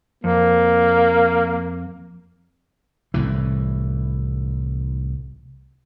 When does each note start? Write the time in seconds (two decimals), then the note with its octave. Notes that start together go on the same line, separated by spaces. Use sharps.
0.24 F2 A#3
3.14 C2 A2 E3